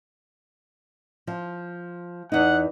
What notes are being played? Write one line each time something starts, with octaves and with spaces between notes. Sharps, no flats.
F3
E2 D#4 F#5